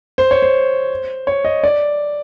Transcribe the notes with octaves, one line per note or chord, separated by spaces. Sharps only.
C5
C#5
C5
C#5
D#5
D5